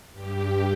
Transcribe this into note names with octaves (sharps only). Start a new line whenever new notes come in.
G2 G4